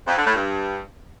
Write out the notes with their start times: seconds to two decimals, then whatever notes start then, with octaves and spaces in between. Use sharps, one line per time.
0.07 F2
0.16 D3
0.26 A2
0.35 G2